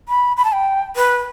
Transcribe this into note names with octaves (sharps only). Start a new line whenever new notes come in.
B5
B5
A5
G5
B4